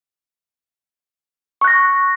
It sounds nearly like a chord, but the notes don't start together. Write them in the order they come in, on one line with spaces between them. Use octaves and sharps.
C#6 F#6 A#6